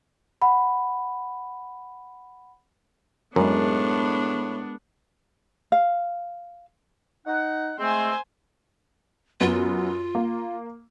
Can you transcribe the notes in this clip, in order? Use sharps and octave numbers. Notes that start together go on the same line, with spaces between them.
F#5 B5
F#2 A2 G#3 B3 D4 A#4
F5
D#4 F#5
G#3 A3 C4 C5 G#5
F#2 B3 F4
A#3